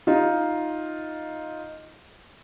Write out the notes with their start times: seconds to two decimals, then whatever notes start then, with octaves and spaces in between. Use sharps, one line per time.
0.07 D#4 F4